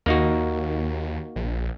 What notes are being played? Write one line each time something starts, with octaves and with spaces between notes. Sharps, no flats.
D#2 A#3 D#4 F#4
A#1